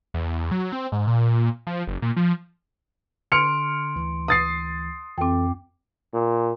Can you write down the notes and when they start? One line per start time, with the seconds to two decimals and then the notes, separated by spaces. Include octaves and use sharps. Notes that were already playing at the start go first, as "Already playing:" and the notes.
0.14 E2
0.51 F#3
0.72 C4
0.92 G#2
1.07 A#2
1.67 F3
1.87 F#1
2.02 A#2
2.17 F3
3.32 D3 C6 F6 C#7 D7 F7
3.96 D2 E3
4.28 D#6 A6 C7
5.18 F2 E3 C4 A4 G5 D6
6.14 A#2